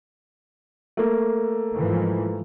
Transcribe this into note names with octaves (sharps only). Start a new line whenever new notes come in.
A3 A#3
G#2 E3 F3